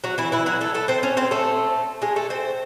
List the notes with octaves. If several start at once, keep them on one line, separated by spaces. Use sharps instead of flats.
F#3 F#4
E3 E4
E3 E4
F#3 F#4
A3 A4
A3 A4
C4 C5
C#4 C#5
C4 C5
A3 A4
G#3 G#4
A3 A4
C4 C5